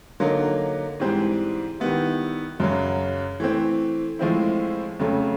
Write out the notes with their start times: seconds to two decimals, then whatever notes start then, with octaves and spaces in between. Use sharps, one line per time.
0.20 D3 F#3 A#3 D#4
1.00 G#2 E3 G3 C4
1.80 D#3 G3 B3 E4
2.60 F#2 C#3 F#3
3.40 E3 A3 C4
4.19 A2 F3 G#3 C4 E4
4.99 F2 C#3 F#3 A3